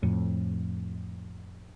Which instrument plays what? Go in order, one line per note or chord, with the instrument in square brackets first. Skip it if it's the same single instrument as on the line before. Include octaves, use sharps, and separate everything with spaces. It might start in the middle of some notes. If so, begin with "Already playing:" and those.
[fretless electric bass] F2 A2